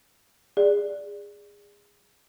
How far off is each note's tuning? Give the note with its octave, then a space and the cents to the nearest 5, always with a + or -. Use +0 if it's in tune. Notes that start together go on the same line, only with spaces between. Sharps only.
G#4 -20 D5 +0